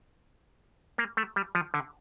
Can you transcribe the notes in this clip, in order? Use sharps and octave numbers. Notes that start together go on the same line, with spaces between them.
A#3
A3
G3
F3
D3